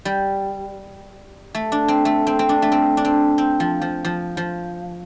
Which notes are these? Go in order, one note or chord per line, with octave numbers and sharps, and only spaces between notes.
G3
A3
D4
C4
A3
C4
C4
D4
A3
C4
D4
C4
C4
F3
F3
F3
F3